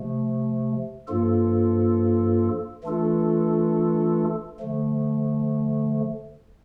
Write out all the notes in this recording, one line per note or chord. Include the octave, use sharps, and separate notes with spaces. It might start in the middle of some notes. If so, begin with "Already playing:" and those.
Already playing: C3 F3 A3
G2 F3 A#3 F4 A4
E3 A3 D4 F4 A4
D3 F3 A3